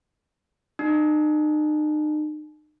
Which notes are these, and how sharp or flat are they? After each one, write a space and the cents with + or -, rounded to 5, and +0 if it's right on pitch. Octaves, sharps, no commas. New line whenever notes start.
D#4 -40